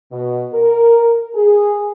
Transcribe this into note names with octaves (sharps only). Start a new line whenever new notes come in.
B2
A#4
G#4